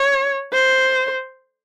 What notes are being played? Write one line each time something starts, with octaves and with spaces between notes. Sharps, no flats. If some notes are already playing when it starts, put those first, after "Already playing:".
Already playing: C#5
C5